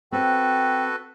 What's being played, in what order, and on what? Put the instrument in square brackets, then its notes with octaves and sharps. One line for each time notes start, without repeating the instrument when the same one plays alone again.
[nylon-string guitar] C4 [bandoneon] F#4 A4 B4 [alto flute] G5